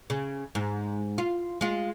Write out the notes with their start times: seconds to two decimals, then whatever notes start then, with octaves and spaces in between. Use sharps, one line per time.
0.10 C#3
0.55 G#2
1.18 F4
1.61 G#3 F4